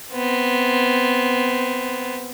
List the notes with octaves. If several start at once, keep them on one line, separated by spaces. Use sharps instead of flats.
B3 C4